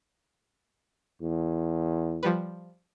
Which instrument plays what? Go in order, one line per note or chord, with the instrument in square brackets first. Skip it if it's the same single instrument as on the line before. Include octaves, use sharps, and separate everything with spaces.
[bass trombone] E2
[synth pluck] F3 G3 B4